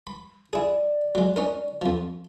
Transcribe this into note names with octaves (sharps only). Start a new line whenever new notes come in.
B5
E4 G#4 D5
F#3 G#3
C#4 D#4 A#4
F2 F3